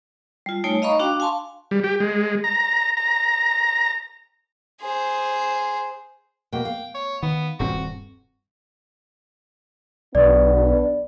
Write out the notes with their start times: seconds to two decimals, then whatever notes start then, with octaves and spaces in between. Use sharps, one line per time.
0.46 G3 F4
0.64 G3 A3 D#4 C#5 G#5
0.82 D#5 F5 A#5 B5 C#6 D#6
0.99 D4 F#4 F5 G5 D6
1.20 F5 G#5 A5 C6 C#6
1.71 G3
1.84 G4
2.00 G#3
2.44 A#5
2.97 A#5
4.82 G#4 C5
6.52 B2 A#3 G5
6.65 F5
6.95 C#5
7.23 D#3 B3
7.60 D#1 G2 C4 F#4
10.15 B1 B3 D4 D5